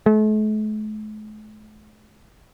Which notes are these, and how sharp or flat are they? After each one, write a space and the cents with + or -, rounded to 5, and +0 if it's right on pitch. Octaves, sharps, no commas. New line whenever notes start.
A3 -45